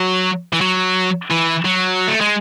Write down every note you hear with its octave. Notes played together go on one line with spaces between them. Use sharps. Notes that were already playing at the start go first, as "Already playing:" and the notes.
Already playing: F#3
E3
F#3
E3
F#3
A3
G#3